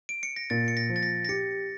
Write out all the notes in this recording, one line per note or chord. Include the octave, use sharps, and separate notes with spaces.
D7
C#7
A#6
A#2 A6
C#7
A#6
F3
A6
A#6
A#6
G4 C#7